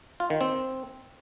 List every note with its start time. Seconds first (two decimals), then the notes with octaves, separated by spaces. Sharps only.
0.20 F4
0.30 D#3
0.41 C4